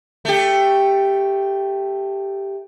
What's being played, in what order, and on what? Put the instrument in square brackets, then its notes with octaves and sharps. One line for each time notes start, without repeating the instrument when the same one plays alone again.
[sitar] A3 G4